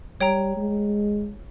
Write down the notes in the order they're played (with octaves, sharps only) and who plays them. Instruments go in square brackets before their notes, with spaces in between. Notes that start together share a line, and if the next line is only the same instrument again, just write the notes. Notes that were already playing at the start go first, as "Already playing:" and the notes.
[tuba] G3 [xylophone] C#5 G5 A#5
[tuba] G#3